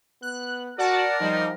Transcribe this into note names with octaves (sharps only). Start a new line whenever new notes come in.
B3 F#6
F#4 A#4 D5 F#5 A5
F3 G3 D#4